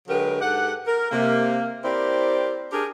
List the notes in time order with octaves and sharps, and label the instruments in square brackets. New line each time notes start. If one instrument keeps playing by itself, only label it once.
[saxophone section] D3 F#3 G#3 G4 A#4 B4
G#2 G4 A4 F#5
A#4
C3 A#3
C4 E4 G4 A#4 C5 D5
D4 G4 G#4 A#4